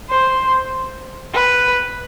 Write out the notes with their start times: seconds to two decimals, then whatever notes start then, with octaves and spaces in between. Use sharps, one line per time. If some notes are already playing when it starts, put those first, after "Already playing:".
0.10 C5
1.34 B4